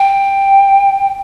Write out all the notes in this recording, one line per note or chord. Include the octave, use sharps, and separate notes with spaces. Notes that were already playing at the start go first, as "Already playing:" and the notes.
Already playing: G5